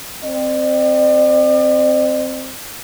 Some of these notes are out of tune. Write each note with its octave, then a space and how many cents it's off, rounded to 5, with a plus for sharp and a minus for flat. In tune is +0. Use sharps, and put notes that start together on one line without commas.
C4 +0 D5 +45